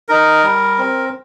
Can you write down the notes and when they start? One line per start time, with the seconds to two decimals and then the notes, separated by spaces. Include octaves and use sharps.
0.09 D#4 A#4
0.44 G3
0.79 C4